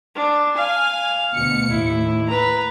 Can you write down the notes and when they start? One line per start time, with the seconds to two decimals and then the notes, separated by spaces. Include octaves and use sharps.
0.15 D4
0.57 F5 G#5
1.35 D2 B2 C#7
1.70 D#2 A2 E4
2.28 B4 A#5